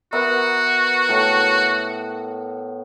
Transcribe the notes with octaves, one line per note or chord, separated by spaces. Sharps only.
B3 F#4 A#4 E5
A2 A5